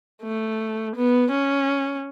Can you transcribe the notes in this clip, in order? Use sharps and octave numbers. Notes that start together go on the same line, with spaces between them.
A3
B3
C#4